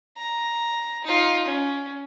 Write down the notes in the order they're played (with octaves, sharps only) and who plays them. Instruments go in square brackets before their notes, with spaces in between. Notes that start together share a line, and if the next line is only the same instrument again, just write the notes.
[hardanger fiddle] A#5
D#4 F4
C#4